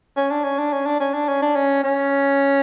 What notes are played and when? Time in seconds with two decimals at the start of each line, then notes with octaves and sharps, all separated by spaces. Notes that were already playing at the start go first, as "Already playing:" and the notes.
0.16 C#4
0.31 D4
0.44 C#4
0.59 D4
0.73 C#4
0.86 D4
1.00 C#4
1.13 D4
1.28 C#4
1.42 D4
1.55 C#4
1.83 C#4